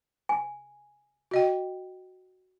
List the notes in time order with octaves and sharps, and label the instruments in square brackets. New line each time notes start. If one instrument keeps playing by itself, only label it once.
[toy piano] G#5
[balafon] F#4 D#5 G5